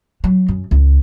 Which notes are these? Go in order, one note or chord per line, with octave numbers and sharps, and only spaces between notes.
F#3
F#2
C#2